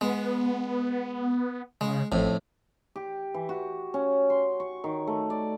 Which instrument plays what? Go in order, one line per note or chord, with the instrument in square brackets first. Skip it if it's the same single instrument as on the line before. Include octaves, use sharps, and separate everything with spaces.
[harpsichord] G#3 [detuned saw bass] B3
[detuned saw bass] C#3 [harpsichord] G#3
[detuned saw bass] A1 [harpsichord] F2 A2
[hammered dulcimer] G4
E3
F#4
C#4
C6
C#6
D#3
A3
D5